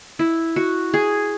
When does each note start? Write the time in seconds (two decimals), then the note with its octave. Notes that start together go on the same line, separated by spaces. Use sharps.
0.19 E4
0.56 F#4
0.94 G#4